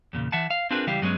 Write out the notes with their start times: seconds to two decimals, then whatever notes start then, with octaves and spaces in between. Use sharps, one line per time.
0.13 E2 A#2 C#3
0.32 E3 E5 F#5 A5
0.50 F5
0.71 C4 D4 F4 G#4 A#4 B4
0.87 C#2 E3 G3 G4 F5
1.01 G2 F#3 G#3 B3 C#4